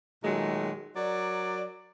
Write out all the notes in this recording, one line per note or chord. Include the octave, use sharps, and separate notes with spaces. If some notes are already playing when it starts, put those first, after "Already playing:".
A#2 D#3 F#3 G#3 A3
F#3 A#4 D5